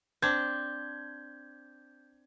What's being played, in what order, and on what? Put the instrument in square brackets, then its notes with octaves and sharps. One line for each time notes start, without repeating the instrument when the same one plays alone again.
[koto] C4 D4 [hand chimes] G6 [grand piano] G#6